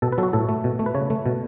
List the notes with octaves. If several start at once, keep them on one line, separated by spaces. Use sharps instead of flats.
B2 A4
B4
F#3 A4
F#4
A2 A4
A3
B2
A3
B4
C#3 C#5
A3
B2